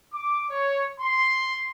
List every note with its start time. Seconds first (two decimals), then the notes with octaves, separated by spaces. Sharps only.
0.14 D6
0.50 C#5
1.01 C6